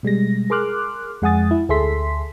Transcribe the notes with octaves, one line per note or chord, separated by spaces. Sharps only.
B2 G3 G#3 A#6
G#4 A#4 C6 D6 F6 F#6
F2 G#3 F#5 G#5 D#6 A6
E4
D2 G#4 A4 E5 C6 B6